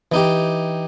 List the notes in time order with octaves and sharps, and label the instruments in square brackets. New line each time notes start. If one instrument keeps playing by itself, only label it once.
[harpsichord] E3 D#4 G4